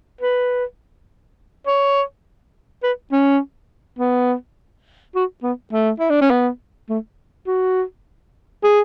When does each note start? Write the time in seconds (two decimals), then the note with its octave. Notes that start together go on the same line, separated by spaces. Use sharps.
0.21 B4
1.67 C#5
2.83 B4
3.12 C#4
3.99 B3
5.15 F#4
5.43 B3
5.73 A3
6.00 E4
6.10 D4
6.21 C#4
6.31 B3
6.89 A3
7.47 F#4
8.63 G#4